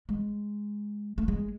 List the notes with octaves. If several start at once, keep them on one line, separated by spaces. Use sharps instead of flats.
G#3
A3
G#3